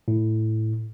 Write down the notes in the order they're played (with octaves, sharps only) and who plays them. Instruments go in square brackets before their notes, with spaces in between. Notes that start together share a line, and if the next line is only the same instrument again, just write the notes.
[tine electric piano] A2